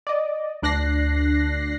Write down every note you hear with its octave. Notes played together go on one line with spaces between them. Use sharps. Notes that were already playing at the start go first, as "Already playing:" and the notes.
D5 D#5
D2 D4 F#6 A#6 C7